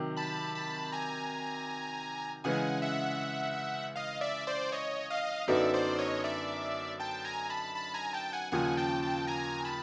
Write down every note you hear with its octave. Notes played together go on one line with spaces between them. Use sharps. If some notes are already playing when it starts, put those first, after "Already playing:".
Already playing: C3 D#3 F#3
A5 B5
A5 B5
G#5 A#5
C#3 E3 G#3 F#5 G#5
E5 F#5
D#5 F5
D5 E5
C5 D5
C#5 D#5
D#5 F5
F#2 D3 F#3 B3 D#4 D5 E5
C5 D5
C#5 D#5
D5 E5
G5 A5
G#5 A#5
A5 B5
A5 B5
G#5 A#5
G5 A5
F#5 G#5
D#2 C#3 F3 F#5 G#5
G5 A5
G5 A5
G#5 A#5
A5 B5